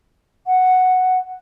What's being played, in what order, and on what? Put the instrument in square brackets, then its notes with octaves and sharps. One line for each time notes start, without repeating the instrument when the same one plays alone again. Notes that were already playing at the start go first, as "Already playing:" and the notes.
[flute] F#5